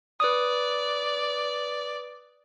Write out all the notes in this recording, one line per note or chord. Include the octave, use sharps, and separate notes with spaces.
B4 D5 D#6